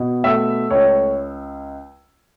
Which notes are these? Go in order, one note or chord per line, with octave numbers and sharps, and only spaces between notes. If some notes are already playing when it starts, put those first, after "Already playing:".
Already playing: B2
A3 E5 E6
C#2 C#5